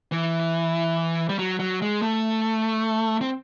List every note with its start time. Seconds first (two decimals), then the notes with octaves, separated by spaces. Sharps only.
0.12 E3
1.29 G3
1.39 F#3
1.59 F#3
1.82 G#3
2.02 A3
3.21 C4